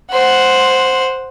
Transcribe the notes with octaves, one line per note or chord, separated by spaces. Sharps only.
C5 F#5